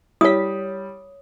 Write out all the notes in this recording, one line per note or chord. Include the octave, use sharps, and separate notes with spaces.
G3 E4 C#5 D#6 B6